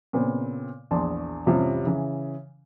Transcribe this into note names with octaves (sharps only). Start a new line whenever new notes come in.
A#2 C#3 B3 C4
A#1 E2 A5 C6
A1 F2 C3 F3 G3 C#4
C#3 E3